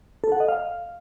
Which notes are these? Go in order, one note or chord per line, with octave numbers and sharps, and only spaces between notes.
A4
F#5
D#5
F5